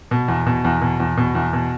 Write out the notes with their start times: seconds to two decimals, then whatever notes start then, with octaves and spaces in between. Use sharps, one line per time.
0.11 B2
0.28 E2
0.46 B2
0.65 E2
0.81 B2
1.00 E2
1.17 B2
1.35 E2
1.53 B2